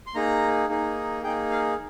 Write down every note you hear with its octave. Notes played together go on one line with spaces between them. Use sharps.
C6
A#3 D#4 G#4 A#5
A#3 D#4 G#4
A#3 D#4 G#4 G5
F5